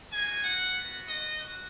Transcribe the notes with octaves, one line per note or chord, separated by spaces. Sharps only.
A#3 D#4 F#4 G#5
F#5
B3 F#4
D#5
F#4